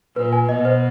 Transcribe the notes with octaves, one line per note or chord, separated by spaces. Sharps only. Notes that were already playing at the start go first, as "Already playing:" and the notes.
A#2 B4
G#5
B2 D#5
C5